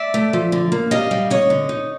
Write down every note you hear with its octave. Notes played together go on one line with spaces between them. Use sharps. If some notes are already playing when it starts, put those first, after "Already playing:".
Already playing: D5 E5
A3
F3
D3
A#3
G3 D#5 F5
G3
D#4 C#5 D#5
D3
D#4